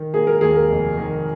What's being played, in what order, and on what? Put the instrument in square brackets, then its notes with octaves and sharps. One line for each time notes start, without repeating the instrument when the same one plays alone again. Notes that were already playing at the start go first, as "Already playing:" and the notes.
Already playing: [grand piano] D#3
[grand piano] A#3 [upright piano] G#4
[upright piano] A#4
[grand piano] D#2 [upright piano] G#4
[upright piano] A#4
[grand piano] F1
D#3